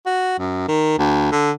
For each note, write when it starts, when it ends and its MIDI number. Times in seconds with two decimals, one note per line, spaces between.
0.06 0.35 66
0.39 0.67 42
0.68 0.94 51
0.99 1.29 38
1.32 1.51 50